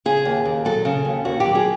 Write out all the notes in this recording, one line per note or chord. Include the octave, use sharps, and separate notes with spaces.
C#3 G#4
D#2
D#2
F#3 A4
C#3
D#2
D#2 F#4
F#3 G4
G#4